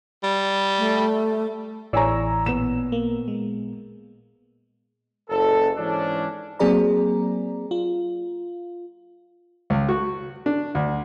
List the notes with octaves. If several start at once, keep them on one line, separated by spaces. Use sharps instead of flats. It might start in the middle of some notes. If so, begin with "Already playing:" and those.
G3
A3
A1 E3 C#5 D5 G#5 A#5 C#6 E6
A#2 B3 E7
A#3
G#3
F#1 A4
G#2 E3 C#4 D4
F#3 A#3 C4 G#4 D5 A#5
F4
C#2
F#4
D4
D2